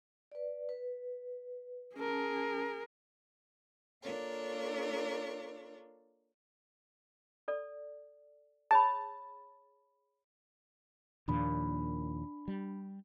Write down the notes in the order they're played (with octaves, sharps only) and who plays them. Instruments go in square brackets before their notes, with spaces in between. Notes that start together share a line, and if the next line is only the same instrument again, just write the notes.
[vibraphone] B4 D5
B4
[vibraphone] C#4 A5 [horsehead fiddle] G#4 A#4
[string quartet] A#3 D4 F4 A4 A#4 C#5
[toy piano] A4 D5
[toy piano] G#4 C#5 B5 [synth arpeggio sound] A5
[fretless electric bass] D#2 A#2 F3 [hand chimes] D4 B5
[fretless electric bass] G3